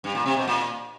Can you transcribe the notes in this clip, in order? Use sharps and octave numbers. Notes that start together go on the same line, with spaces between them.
G2
A#2
C3
B2
A#2